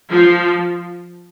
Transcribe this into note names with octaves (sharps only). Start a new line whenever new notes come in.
F3